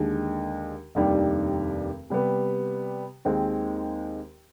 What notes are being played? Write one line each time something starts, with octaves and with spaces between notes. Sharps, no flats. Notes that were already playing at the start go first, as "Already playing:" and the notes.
Already playing: D#2 D3 G#3
F1 D#2 D#3 G3 D4
C3 G3 B3
D#2 D#3 G#3 C4